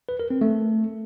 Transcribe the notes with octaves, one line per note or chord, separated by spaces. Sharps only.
B4
A#4
C4
A3